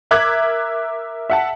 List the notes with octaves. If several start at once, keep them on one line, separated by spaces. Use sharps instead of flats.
A#4 E5 D6 F#6 G#6
E5 F#5 A5